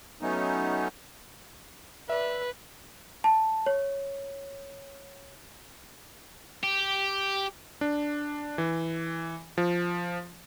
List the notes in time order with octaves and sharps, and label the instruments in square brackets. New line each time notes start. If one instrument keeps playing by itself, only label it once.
[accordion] F#3 A3 B3 C#4 D#4
[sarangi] B4 [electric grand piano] D5 E5
[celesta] A5
C#5
[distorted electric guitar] G4
[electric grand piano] D4
E3
F3